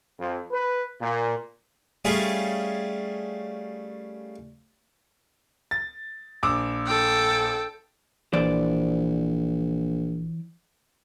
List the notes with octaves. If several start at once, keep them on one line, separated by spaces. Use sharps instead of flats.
F2
B4
A#2
G3 A3 C#4 F4 G#4
A6
A#1 D6 E6
A4 G5
A#1 E3 C5 D5